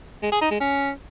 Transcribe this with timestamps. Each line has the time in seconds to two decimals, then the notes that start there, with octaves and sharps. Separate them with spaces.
0.23 G#3
0.32 G#4
0.42 D#4
0.51 G#3
0.60 C#4